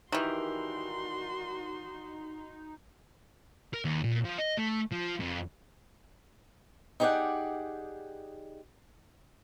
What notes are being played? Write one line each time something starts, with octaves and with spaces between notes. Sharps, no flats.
D#3 E3 D4 D#4 F#4 G4 A#4 C6
A#4
D#2
A#2
F3
D#5
A3
F3
F2
D#4 G4 G#4 C#5 D5 F#5